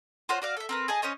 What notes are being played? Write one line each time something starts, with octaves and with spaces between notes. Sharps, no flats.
F4 F#4 C5 C#5
F#4 D5 F5
A4 E5
C4 A#4 B4
G#4 D#5 G#5 A5
C#4 C5 C#5 D#5